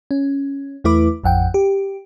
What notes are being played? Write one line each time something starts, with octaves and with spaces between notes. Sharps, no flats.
C#4
E2 A3 E4 B4 D6
A1 F2 F#5 G5
G4